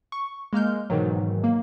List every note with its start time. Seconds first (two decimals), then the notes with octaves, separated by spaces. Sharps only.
0.12 C#6
0.53 G#3 A#3 F6 G6
0.90 G#2 B2 D#3 E3 F#3
1.44 A#3